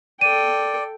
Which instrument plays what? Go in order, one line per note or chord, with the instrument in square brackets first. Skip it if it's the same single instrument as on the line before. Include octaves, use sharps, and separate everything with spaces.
[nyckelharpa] A4 G5 [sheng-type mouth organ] D5 [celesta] D#7